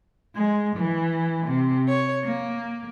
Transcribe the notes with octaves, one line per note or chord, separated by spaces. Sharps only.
G#3
E3
C3
C#5
A#3